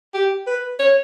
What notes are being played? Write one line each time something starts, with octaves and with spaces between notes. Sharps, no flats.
G4
B4
C#5